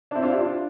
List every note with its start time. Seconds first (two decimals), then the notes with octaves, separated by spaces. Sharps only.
0.11 D4
0.15 C4 E4
0.23 D4 F4
0.31 E4 G4
0.39 D4 F4